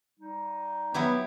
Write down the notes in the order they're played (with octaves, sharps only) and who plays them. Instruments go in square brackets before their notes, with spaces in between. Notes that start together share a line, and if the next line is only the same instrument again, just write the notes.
[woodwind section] G3 D#4
[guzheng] F#3 E4 G4 [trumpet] B3